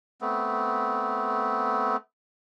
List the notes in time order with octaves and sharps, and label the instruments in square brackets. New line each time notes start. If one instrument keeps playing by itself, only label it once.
[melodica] A3 B3 C4